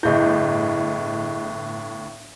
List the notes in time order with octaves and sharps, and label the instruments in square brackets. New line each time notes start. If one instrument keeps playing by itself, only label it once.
[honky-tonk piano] G1 A2 G6 [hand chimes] E4 G#4 D#5